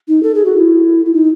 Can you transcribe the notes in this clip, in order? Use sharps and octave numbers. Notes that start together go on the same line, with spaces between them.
D#4
A4
G#4
F#4
E4
E4
D#4